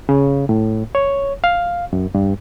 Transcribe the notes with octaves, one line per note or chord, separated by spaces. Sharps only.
C#3
A2
C#5
F5
F#2
G2